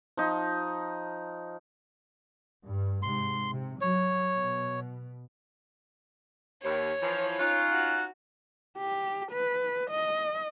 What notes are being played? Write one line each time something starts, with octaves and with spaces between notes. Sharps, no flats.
F3 D#4
G2
G#2 C3 C6
C3
F#3 C#5
B2
D#2 C#5
E3 F3
C#4 D#4 F4 F#6
F#4
G4
B4
D#5